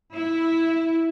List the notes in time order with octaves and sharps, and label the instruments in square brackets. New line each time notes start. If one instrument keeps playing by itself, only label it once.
[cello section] E4